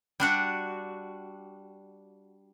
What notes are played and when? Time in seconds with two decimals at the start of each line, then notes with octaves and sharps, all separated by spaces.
0.20 G3 D4 F#4